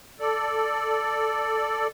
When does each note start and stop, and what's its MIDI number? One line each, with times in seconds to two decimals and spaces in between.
0.20 1.87 69
0.20 1.87 74